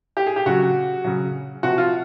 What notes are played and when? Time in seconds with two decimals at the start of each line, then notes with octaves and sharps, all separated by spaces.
0.17 G4
0.27 G#4
0.36 G4
0.46 C#3 F#3 F#4
1.04 C#3 F#3
1.63 C3 F3 F#4
1.78 F4